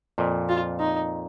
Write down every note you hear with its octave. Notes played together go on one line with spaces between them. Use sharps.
F2 A#2
F4
D#4